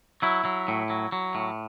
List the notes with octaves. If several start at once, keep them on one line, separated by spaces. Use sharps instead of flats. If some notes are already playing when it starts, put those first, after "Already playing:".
F#3 E4
F#3
A2
F#3
F#3
A2